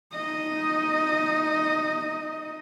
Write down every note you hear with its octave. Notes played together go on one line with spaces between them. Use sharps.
D#4 D#5